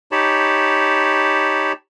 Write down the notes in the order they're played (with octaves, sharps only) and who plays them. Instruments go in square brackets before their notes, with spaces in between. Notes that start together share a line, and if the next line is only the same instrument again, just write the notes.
[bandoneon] D#4 G4 C#5 A5 B5